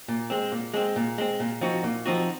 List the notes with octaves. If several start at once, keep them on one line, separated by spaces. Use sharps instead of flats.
A#2
G#3 C4
A#2
G#3 C4
A#2
G#3 C4
A#2
F3 C4 D#4 F#4
A#2
F3 C4 D#4 F#4